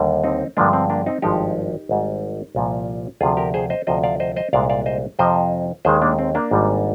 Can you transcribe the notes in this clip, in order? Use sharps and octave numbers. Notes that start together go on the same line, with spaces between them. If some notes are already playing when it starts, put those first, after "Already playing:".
Already playing: D#2 D3 G3
C4 D#4
G2 D3 F3 G#3 A#3 D4
C4
A#3 D4
C4 D#4
G#1 G2 F3 G#3 D#4 G4
G#1 G#2 G3
C2 A#2 F3
D2 C3 F3 F4 G#4
G4 A#4
G#4 C5
C5 D#5
D2 C3 F3 C5 D#5
D5 F5
C5 D#5
C5 D#5
C2 A#2 G#3 D5 F5
D5 F5
C5 D#5
F2 C3 F3 C5 D#5
D#2 D#3 G#3 G#4 C5
A#3 D4
C4
A#3 D4
G#1 G#2 G3